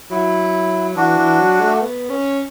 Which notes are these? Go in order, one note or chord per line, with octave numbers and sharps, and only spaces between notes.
F#3 E4
E3 D4 F#4
E3
F#3
A3
B3
C#4